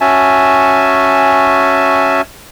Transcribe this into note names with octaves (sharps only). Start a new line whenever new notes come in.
C#4 F#4 E5 G#5 A5